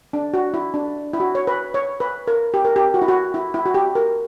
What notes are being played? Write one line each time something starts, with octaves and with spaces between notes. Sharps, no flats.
D4
F#4
E4
D4
E4
F#4
C#5
B4
C#5
B4
A#4
G4
A#4
G4
F#4
E4
F#4
E4
E4
F#4
G4
A#4